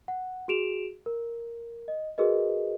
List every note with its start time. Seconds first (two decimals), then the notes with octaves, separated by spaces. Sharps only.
0.08 F#5
0.48 F#4 G#4 D7 E7 F7
1.06 A#4
1.88 D#5
2.18 F#4 G#4 A#4 B4 D#5